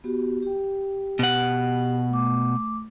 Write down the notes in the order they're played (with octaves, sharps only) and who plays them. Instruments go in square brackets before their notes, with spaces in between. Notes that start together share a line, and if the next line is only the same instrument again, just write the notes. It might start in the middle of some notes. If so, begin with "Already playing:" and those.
[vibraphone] B3 F#4 G4
G4 G5
[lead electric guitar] B2 F#5
[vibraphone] A3 D6